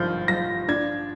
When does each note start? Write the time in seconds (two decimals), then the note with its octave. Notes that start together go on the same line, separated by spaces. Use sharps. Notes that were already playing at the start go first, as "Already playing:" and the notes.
Already playing: G#1 G2 F3 F6 G6
0.28 F3 A#6
0.68 D4 G#6